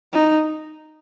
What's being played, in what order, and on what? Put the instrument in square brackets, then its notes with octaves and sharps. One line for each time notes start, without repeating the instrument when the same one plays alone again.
[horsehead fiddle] D#4